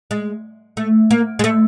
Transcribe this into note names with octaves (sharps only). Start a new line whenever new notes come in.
G#3
A3
A#3
G#3
A3